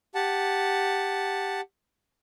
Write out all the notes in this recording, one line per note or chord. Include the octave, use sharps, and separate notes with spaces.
G4 F#5 A5